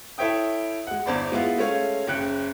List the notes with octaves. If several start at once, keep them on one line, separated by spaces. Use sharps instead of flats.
E4 A4 C#5 E5 G5 D#6
G#3 F#5
G1 E2 C5 D5 B5
G#3 B3 E4 F4
G#3 A3 C#4 C#5 F5
F#1 C#3 G5 F#6 C#7